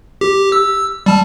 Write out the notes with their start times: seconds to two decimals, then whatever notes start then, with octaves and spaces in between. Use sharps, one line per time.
0.21 G4
0.52 E6
1.06 G3 A5